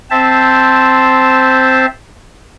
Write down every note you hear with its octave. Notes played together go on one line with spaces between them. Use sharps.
C4 C5 E5 A5